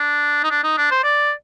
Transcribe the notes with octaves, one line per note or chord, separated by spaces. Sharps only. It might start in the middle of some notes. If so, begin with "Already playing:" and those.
Already playing: D4
D#4
D4
D#4
D4
C5
D5